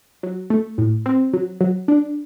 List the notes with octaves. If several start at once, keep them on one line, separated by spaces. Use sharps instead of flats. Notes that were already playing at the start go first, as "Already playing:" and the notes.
F#3
A3
A2
C4
F#3
F#3
D4